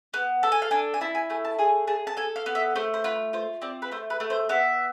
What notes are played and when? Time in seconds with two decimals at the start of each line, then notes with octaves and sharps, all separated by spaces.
0.14 B3
0.43 A4 A5
0.52 G#5
0.62 F5
0.71 D4 G#5
0.94 G#5
1.01 E4 A5
1.15 G#5
1.30 A3 G#5
1.45 A5
1.59 G#4 G#5
1.87 G#4 A5
2.07 A5
2.17 A4 G#5
2.36 F5
2.46 B3
2.55 E5
2.76 A3 C5
2.94 C5
3.04 F4 B4
3.33 F4 C5
3.62 C4 D5
3.82 B4
3.91 A3 C5
4.10 B4
4.20 A3
4.30 C5
4.49 B3 E5